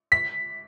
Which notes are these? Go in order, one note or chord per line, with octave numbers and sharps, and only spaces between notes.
B6